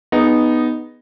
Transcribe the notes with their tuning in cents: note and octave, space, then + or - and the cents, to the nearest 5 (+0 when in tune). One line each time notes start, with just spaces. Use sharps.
B3 +0 D#4 -5 G#4 +0